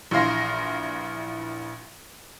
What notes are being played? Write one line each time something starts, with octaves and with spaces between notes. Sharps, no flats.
A#1 E3 F5 C6 A#6